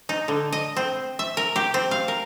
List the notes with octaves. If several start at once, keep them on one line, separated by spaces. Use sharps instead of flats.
D#4
D3
D#5
C4
E5
A#4
G4
C4
F5
A#4